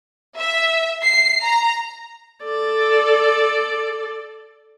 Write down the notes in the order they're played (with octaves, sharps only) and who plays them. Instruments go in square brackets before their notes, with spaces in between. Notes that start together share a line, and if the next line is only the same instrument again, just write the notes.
[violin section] E5
C7
A#5
[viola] A4 D5